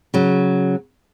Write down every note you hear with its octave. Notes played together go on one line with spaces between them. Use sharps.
C#3 F#3